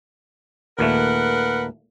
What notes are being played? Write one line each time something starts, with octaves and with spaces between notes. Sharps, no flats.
D#2 A#2 A3 A#4 B4 F#5